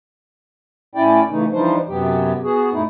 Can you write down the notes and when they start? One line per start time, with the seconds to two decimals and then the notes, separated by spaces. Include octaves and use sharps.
0.95 A2 C#4 E4 D5 G5
1.30 C#3 E3 A3 D#4
1.52 E3 F3 G3 D4 D#4 C5
1.88 F#2 C3 F#3 B3 G4
2.43 B3 F#4 G#4
2.73 F#2 A#2 A3 D#4 E4